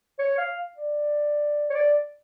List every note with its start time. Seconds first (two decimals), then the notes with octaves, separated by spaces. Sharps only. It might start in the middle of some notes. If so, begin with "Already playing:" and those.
0.19 C#5
0.38 F5
0.77 D5
1.70 C#5
1.75 D5